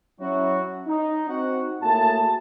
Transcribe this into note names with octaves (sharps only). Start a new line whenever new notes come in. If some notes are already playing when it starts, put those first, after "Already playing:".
F#3 C#4 E4 F#4
D#4
C4 D#4 F#4 F#5
A2 A3 A#3 F#4 G#4 A5